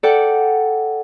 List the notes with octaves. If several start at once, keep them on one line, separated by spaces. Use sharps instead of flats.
A4 D5 F#5 G5